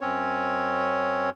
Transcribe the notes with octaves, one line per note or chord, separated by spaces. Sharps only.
F#2 C4 C#4 C#5